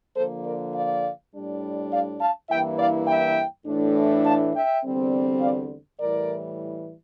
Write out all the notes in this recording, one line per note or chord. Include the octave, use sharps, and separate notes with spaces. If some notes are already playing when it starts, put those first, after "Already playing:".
D3 F3 A#3 A4 C5
A#4 D5
D5 F5
A2 G3 D4
D5 F5
F5 A5
G2 E3 A#3 E4 E5 G5
D5 F5
E5 G5
A2 E3 A3 D4
F5 A5
E5 G5
E2 D3 G3 C4
D5 F5
A2 E3 G3 A#4 D5